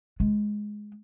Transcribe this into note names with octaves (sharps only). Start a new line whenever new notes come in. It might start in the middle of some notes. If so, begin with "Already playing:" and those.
G#3